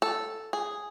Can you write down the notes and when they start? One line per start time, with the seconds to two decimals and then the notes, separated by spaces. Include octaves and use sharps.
0.02 A4
0.53 G#4